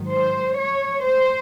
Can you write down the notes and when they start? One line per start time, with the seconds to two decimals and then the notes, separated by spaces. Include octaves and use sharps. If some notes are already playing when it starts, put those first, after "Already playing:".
Already playing: G#2 D#3 F#3
0.11 C5
0.58 C#5
1.06 C5